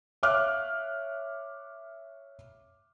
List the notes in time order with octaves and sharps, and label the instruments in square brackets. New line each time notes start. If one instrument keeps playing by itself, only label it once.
[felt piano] C#5 E5 F5 D6 F6 F#6